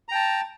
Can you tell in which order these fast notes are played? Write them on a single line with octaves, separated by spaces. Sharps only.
A#5 G5 A5